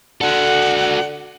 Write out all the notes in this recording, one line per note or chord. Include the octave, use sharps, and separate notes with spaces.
D3 F#4 A4 F#5